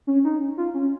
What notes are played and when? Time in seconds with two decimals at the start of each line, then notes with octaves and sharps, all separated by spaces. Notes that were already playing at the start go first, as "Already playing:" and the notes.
0.07 C#4
0.25 D#4
0.57 F4
0.74 C#4